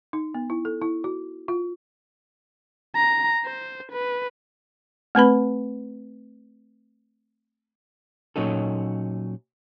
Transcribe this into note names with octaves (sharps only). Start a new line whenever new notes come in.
D#4
B3
E4
A4
E4
F#4
F4
A#5
C5
B4
A3 C4 B4 B5
A#2 F#3 C#4 D#4 A4